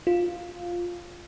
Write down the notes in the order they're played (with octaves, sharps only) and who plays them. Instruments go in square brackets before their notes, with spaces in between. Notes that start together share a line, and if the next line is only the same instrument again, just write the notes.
[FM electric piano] F4